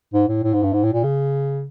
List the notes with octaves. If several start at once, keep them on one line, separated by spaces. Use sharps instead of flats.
G#2
A2
A2
G#2
G2
G#2
A2
A#2
C#3